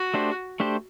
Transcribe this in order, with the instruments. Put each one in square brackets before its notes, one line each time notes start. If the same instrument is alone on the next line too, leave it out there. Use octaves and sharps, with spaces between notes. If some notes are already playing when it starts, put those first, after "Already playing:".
Already playing: [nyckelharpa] F#4
[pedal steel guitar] A3 D4 G4 C5
A3 D4 G4 C5